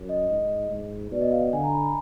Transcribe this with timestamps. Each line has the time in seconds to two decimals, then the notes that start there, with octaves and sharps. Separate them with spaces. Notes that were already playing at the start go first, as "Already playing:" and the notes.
Already playing: F#2
0.09 D#5
0.30 G#2 D#5
0.70 G#2
1.11 B2 D5
1.21 D#5
1.32 F5
1.42 F#5
1.53 D3 G#5
1.63 A#5
1.73 B5
1.83 A#5